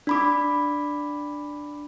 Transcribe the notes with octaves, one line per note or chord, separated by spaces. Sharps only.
D4 B5 D6